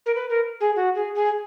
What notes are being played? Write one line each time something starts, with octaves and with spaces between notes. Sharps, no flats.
A#4
B4
A#4
G#4
F#4
G#4
G#4